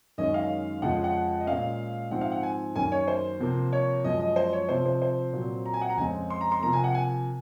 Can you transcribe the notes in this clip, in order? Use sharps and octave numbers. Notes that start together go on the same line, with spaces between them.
F#2 D#3 G#3 C#4 D#5
F5
F2 C#3 F3 G#3 F#5
F#5
D#5
A#2 G#3 C#4 F5
G#2 F3 C4 F#5
F5
F#5
G#5
F#2 D#3 A#3 C#4 G#5
C#5
C5
C3 F3 A#3
C#5
F#2 F3 G#3 D#5
D#5
C5
C#5
C3 F3 C4 C5
C5
C5
A#2 F#3 C4
A#5
G#5
F#5
A#5
F2 C#3 G#3 C4 G#5
C6
A#5
C6
C3 F3 A#3 A#5
G#5
F#5
G#5